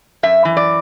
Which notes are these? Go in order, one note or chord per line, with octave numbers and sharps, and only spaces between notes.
F#2 E5
E3
D5